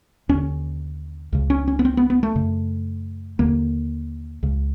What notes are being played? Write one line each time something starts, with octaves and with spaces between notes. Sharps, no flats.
D#2 D3 C#4
C#2 C#3
C#4
C#4
B3
C4
B3
B3
A3
F#2 C#3
D#2 D3 A#3
C#2 C#3